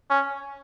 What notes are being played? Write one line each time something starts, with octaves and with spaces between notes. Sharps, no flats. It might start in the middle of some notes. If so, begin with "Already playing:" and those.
C#4